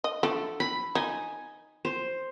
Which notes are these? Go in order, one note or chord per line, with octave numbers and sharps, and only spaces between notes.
D#5
D3 A3 A4
B5
D#4 G#5
C5